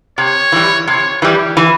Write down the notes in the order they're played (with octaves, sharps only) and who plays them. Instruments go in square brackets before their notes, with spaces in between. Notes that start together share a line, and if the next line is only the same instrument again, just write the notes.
[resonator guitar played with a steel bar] C3 [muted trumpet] C#5
[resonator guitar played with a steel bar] E3 G3
[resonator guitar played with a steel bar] C3 [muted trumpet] C#5
[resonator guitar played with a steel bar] E3 G3 [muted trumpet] G4
[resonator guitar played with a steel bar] E3